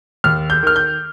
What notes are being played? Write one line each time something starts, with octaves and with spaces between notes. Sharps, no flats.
D#2 F6
G6
D#3 F6
G6